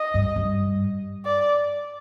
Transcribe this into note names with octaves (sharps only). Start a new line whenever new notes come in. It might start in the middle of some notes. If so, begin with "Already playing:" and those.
Already playing: D#5
G2
G2
D5